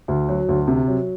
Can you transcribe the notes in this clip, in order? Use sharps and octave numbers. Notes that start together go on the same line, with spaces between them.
D2
F#3
D2
C3
F#3